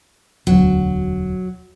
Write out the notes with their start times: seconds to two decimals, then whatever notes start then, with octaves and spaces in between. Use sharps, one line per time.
0.47 E1 D2 F#3